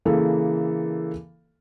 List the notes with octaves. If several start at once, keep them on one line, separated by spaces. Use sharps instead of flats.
C#3 E3 A#3 A4